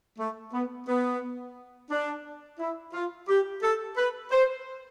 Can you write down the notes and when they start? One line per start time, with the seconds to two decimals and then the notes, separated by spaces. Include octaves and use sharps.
0.19 A3
0.53 B3
0.87 B3
1.91 D4
2.60 E4
2.94 F4
3.29 G4
3.63 A4
3.97 B4
4.32 C5